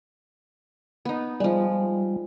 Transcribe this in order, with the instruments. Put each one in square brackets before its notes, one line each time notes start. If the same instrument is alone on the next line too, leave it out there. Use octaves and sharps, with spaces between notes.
[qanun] B3 D#4
[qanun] F3 G#3 [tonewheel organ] G3